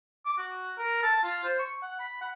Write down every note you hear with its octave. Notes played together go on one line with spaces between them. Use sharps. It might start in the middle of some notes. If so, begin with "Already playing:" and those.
D6
F#4
A#4
A5
F4
C5
C#6
F#5
B5
F#5